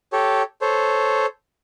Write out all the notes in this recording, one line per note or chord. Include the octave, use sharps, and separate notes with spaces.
G4 A4 C#5
A4 C5 C#5